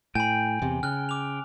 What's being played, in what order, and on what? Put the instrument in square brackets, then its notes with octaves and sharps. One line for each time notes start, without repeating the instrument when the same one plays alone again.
[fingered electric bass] A2 [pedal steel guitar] G5 [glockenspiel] G#5 B5
[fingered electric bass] E2 C3
[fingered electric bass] C#3 [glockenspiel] F6 F#6
[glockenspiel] D6 F7